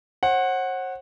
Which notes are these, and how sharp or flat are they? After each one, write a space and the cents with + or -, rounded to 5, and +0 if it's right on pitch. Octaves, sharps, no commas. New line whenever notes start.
C5 +45 F#5 +0